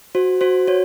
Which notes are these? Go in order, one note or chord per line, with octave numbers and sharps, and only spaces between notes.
F#4 C5
F#4 C5
F#4 C#5